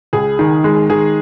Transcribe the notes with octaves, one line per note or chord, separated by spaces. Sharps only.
C#2 G#4
D#3
G#3
D#3 G#4